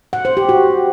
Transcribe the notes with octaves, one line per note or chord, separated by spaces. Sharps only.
F#5
C5
G4
F#4